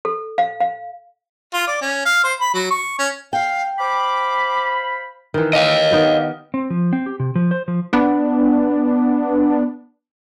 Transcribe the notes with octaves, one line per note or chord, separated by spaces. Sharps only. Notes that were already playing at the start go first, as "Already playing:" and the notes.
A4
F5
F5
F4
D5
C#4
F5
C5
B5
F#3
C#6
C#4
F5 G5
C5 F5 B5 D6
D#3 E3
D#5 F5
D#3 B3 G4
C4
F3
C4
G4
C3
F3
C5
F3
B3 D4